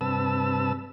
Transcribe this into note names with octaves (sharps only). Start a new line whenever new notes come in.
G2 C3 B4 A5 E6